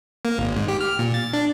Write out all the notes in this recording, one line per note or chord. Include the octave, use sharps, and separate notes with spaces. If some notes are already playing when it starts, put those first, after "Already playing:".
A#3
G#1
G#2
G4
F6
A#2
A6
D4